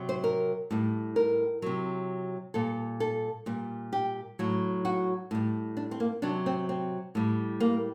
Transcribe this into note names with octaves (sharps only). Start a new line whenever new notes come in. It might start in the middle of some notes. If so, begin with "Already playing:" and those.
Already playing: C3 F#3
C5
A#4
A2 G3
A#4
C3 F#3
A#2 G3 A4
A4
A#2 G3
G4
A2 F#3
F#4
A2 G3
D4
C4
A#3
C3 F#3 D4
C4
C4
A2 G3
A#3